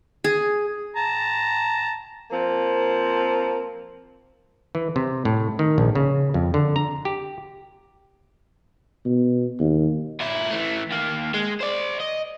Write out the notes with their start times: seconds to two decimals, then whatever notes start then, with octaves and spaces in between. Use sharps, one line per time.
0.24 G#4
0.96 A5 A#5
2.31 F3 A#3 C4
4.75 E3
4.96 C3
5.25 A2
5.59 D#3
5.78 A#1
5.95 C#3
6.34 F2
6.54 D3
6.76 A#5
7.05 G4
9.05 B2
9.60 D#2
10.21 A#2 E4
10.50 E3 A3
10.91 D#2 A#3
11.34 G#3
11.61 C5 D5
12.01 D#5